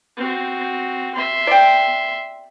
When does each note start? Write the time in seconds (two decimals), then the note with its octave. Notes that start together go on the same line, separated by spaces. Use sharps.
0.17 C4 F#4
1.14 E5 C6
1.47 D5 G5